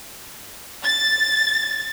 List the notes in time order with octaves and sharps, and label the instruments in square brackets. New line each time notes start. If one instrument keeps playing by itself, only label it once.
[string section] A6